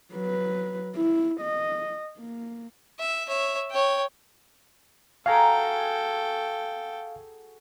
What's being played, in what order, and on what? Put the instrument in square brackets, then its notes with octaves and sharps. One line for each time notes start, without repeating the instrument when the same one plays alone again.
[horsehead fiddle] F#3 B4
E4
D#5
A#3
[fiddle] E5
C#5 E5
C#5 G5
[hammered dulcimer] F#4 G#4 A#5 [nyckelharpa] A4 G5 [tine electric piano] F5